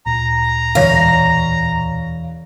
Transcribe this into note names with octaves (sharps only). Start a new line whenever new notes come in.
D2 A#2 A#5
E1 C#5 F5 A#6